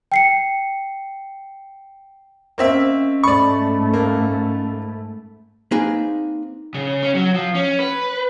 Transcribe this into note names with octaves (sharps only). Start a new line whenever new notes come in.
G5 C7 C#7
A#3 C4 C#4 D#5 E5
G#2 A3 D5 B5 C#6
A#3
A#3 C4 D#4 G#4 B4
C#3
C#4
F#3
F3
C#4
B4